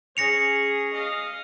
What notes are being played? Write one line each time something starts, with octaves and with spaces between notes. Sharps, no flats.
C#4 G#4 A#6 C#7 F7
D#5 F5